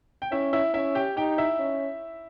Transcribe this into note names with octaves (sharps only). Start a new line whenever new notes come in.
G5
C#4 E4 E5
E4 E5
C#4 E4 E5
G4 G5
D#4 G4 G5
E4 E5
C#4